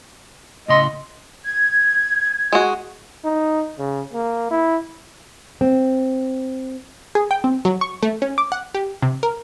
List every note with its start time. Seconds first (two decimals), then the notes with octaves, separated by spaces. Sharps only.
0.68 A2 C#3 D#5 C6
1.44 G#6
2.53 G#3 F#4
3.25 D#4
3.78 C#3
4.13 A#3
4.51 E4
5.61 C4
7.15 G#4
7.31 G5
7.44 C4
7.65 F#3
7.81 C#6
8.03 A3
8.22 C#4
8.38 D6
8.52 F#5
8.75 G4
9.02 C3
9.23 A#4